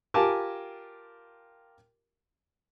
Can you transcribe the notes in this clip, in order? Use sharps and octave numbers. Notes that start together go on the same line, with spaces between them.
F4 G4 A#4 G#5 A5 D6